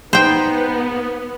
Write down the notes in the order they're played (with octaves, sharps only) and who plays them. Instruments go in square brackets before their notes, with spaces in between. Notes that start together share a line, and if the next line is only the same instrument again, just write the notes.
[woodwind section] G#2 D#4 [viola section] B3 [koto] C5 G5